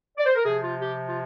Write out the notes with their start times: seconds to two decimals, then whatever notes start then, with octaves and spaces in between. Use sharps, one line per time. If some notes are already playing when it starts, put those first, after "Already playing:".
0.17 D5
0.26 C5
0.35 A#4
0.44 C3 F3 G#4
0.62 F4
0.80 G4
1.08 F4